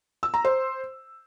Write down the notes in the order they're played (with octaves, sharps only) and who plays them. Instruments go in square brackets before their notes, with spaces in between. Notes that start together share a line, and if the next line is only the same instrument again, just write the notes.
[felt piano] E6
A#5
C5